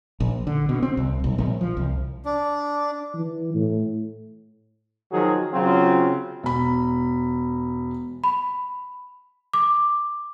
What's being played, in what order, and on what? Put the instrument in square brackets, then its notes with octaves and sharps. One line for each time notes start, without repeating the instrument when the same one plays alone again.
[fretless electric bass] A#1
D3
B2
C4
C2
B1
A#1
F3
C2
[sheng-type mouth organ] D4
[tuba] E3
A2
[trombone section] D#3 F3 F#3 F#4 G#4
C#3 F#3 C4 F4
[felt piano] E1 B5
[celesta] B5
D6